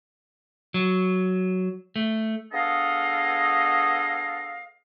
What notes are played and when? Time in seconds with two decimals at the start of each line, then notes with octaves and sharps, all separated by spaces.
0.74 F#3
1.96 A3
2.52 B3 D4 G#4 A4 D#5 F5